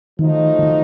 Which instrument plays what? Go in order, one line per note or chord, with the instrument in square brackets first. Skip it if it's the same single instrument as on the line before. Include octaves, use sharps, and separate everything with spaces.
[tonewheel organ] D#3 [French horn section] F3 A3 D#4 F#4
[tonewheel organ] D#3